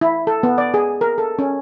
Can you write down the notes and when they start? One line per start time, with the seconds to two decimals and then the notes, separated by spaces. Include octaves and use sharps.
0.01 E4
0.27 A4
0.43 B3
0.58 D5
0.74 G#4
1.01 A#4
1.18 A4
1.39 C#4